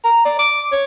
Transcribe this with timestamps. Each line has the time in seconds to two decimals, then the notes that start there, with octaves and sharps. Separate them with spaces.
0.05 A#5
0.25 D5
0.39 D6
0.72 C#5